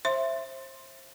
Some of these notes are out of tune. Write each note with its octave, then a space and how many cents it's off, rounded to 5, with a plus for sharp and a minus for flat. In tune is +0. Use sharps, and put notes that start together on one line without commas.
C5 +30 E5 +10 C6 +5